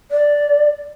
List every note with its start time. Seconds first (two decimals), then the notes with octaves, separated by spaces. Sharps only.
0.11 D5